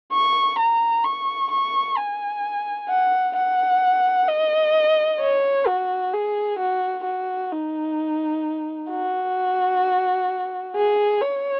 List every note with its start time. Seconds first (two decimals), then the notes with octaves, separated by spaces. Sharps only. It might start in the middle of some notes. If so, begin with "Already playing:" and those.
0.12 C#6
0.58 A#5
1.04 C#6
1.51 C#6
1.97 G#5
2.89 F#5
3.36 F#5
4.28 D#5
5.20 C#5
5.67 F#4
6.13 G#4
6.59 F#4
7.05 F#4
7.52 D#4
8.91 F#4
10.76 G#4
11.22 C#5